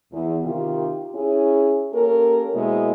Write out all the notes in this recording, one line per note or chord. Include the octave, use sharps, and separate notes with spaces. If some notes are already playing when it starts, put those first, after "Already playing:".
E2
C3 D#3 F4 G4
C#4 E4 G#4
A#3 C#4 G4 A4 A#4
B2 G#3 A#3 E4 C5 D#5